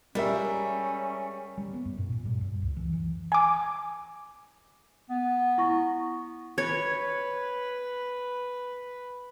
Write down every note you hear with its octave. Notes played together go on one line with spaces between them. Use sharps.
G3 G#3 C#4 A#4 E5
G3
B3
F#2
A#2
A#2
G2
F#2
C#2
E3
E3
G#5 D6
B3
E4 C#6 A#6
B4 C#5